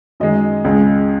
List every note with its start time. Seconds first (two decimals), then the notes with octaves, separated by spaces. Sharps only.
0.20 F#2 D#3 G#3 D#5
0.64 C#2 C#3 G#3